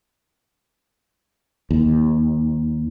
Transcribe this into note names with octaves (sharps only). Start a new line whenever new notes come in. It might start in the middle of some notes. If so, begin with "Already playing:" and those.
D#2